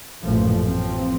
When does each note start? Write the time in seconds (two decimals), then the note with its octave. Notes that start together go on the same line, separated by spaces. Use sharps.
0.23 A1 F#2 A#2 F3 A3
0.66 A1 F3 C4